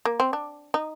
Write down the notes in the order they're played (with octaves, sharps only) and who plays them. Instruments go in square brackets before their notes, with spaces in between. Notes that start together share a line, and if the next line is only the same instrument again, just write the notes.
[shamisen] A#3
C4
D4
D#4